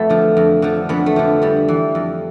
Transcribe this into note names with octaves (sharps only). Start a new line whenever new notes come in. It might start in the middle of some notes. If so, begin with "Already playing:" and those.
Already playing: F2 A3 B3
D3 F3
F2
D3 F3
F2 B3
A3
D3 F3
F2 G3
E3
F2